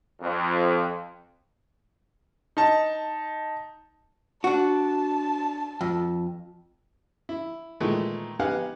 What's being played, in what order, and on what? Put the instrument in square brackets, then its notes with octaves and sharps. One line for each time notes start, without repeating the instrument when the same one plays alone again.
[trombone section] F2
[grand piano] D#4 A5
[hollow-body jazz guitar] D4 F#4 [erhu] A5
[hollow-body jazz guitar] F2
[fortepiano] E4
A#2 D#3 E3 G#3 A3
B3 D#4 G4 F5 F#5 G#5